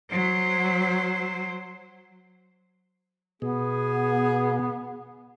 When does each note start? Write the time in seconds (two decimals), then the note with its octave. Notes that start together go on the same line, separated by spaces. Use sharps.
0.11 F#3 C5
3.42 B2 B3 G#4